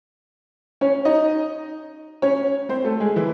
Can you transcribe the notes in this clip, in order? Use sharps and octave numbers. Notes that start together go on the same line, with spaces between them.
C#4 C#5
D#4 D#5
C#4 C#5
C4 C5
A3 A4
G#3 G#4
E3 E4